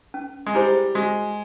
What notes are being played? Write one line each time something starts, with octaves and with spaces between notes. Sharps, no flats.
C#4
G#3
G3 E4 G#4 C5
G#3 F#4